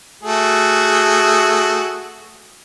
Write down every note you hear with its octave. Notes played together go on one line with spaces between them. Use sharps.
A3 F#4 G#4